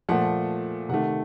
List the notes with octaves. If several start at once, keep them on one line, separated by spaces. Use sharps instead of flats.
A#2 F3 A3 F#5
C3 D#3 A3 F#5